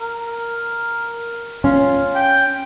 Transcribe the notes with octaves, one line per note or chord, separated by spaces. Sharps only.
A#4
C#4 F4
G5